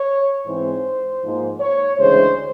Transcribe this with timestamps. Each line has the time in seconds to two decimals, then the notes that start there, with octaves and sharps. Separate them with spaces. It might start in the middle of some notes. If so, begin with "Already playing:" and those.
Already playing: C#5
0.45 G#2 E3 G#3 C4 C5
1.22 G#2 F3 A#3 D#4
1.60 C#5
1.98 D2 C#3 E3 G#3 C5